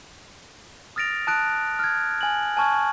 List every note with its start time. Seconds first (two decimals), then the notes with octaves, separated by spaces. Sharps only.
0.96 D#6 F6 A6 A#6 D7 F7
1.27 A5 D#6 F#6 A6 D7
1.79 F6 G#6
2.21 G#5 F#7
2.57 G#5 A5 C#6 F6 G#6